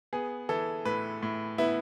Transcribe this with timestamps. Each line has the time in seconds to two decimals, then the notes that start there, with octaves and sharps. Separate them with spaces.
0.13 B3 G#4
0.49 E3 A4
0.85 A2 B4
1.22 A2
1.58 B3 E4